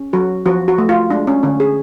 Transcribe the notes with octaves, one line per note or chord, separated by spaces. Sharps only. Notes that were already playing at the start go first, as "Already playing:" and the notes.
Already playing: C#4
F#3 F#4
F3 F#4
F#4
A3
F4
G#3 D4
C#4
D3 C#4
G#4